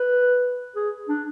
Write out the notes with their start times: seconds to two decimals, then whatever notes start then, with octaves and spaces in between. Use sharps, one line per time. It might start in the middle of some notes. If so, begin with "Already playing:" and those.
Already playing: B4
0.76 G#4
1.09 D4